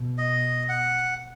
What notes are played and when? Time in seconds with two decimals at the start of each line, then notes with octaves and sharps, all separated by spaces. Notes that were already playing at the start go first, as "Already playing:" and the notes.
Already playing: B2
0.18 D#5
0.69 F#5